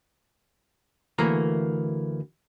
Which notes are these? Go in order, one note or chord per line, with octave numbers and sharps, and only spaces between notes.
D2 E3 A3 A#3 A#5